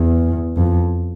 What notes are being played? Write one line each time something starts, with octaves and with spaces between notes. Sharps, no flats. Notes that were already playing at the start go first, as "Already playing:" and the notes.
Already playing: E2
F2